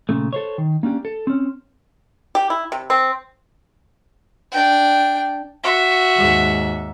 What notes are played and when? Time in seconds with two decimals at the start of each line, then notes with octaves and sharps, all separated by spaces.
0.09 A#2 C#3 A3
0.33 A4 C5 C#5
0.58 D#3
0.83 A#3 C#4 D4 G4
1.05 A4
1.27 C4 C#4
2.35 G4
2.50 E4
2.72 C3
2.90 C4
4.52 D4 G5
5.64 F#4 E5
6.17 D#2 G#2